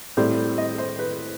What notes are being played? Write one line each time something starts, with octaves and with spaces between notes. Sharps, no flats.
A2 G3 C4 C5
D#5
C5
B4